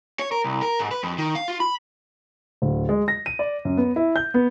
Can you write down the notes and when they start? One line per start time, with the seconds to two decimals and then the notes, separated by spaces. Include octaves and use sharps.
0.20 C#5
0.32 A#4
0.44 C2
0.62 A#4
0.79 G#2
0.91 B4
1.03 F2
1.18 D#3
1.35 F5
1.48 F4
1.60 B5
2.62 D1
2.89 G#3
3.08 A#6
3.26 D#7
3.39 D5
3.65 F#2
3.77 B3
3.96 E4
4.16 G6
4.34 B3